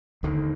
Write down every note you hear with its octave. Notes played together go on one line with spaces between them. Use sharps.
D#2 D3 D#3